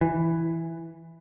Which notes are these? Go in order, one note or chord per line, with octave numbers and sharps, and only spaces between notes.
E3